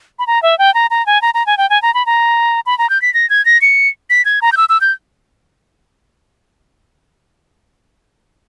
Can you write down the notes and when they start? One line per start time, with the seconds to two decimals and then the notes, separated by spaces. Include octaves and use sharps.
0.19 B5
0.27 A#5
0.43 E5
0.59 G5
0.74 A#5
0.90 A#5
1.06 G#5
1.22 A#5
1.34 A#5
1.47 G#5
1.58 G5
1.70 G#5
1.82 A#5
1.94 B5
2.06 A#5
2.66 B5
2.78 A#5
2.90 G6
3.02 B6
3.14 A#6
3.30 G#6
3.45 A#6
3.62 C#7
4.10 B6
4.25 G#6
4.42 A#5
4.52 G6
4.57 E6
4.69 E6
4.81 G6